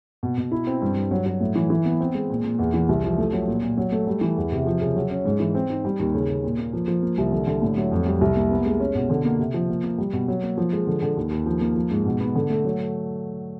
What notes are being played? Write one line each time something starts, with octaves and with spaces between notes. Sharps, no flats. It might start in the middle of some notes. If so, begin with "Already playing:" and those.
B2
B2
E4
C4
G2
G2
F#3
F#3
A2
E3
E3
B3
C4
G#3
A#2
A#2
E2
E3
C2
F3
A3
F#3
A#2
A#2
F#3
A3
G3
E3
E2
C3
F3
C#3
F#3
C#4
G#2
E3
C4
D#4
G3
D#2
C#3
C#3
A#2
A#3
F3
F3
A#3
C2
D3
D3
A2
F#3
F2
G3
C2
A#3
B3
G#3
C#4
B2
D3
A#3
C3
F3
A#3
A#3
G3
B2
F#3
A#3
F3
G#3
D3
D3
D#2
D#2
F3
A#3
F3
G#2
B2
B3
D3
A3
F#3